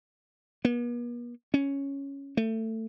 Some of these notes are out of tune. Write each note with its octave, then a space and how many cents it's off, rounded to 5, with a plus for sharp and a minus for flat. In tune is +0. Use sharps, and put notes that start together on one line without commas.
B3 -45
C#4 +0
A3 +20